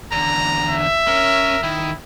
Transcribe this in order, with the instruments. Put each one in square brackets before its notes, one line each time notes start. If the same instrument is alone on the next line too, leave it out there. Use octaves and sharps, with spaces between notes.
[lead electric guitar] E2 D3 [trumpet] A#5
[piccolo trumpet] E5
[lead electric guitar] C#4 [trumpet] A#4
[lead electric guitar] D#3 [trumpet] E4